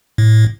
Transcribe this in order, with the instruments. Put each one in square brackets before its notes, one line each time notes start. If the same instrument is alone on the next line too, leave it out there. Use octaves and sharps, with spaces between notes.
[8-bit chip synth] A2